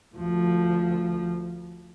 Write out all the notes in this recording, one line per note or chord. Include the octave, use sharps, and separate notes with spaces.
D2 F3